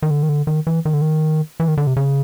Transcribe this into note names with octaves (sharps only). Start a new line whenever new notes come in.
D#3
D3
D#3
D3
D#3
E3
D#3
D3
D#3
E3
D#3
D3
C3
C#3